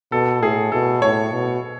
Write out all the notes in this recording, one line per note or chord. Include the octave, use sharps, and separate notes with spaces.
B2 A4
A2 G#4
B2 A4
A2 C#5
B2